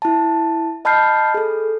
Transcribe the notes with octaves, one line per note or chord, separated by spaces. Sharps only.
E4 A5
D#5 A5 B5 F6 G6 C7
G#4 A4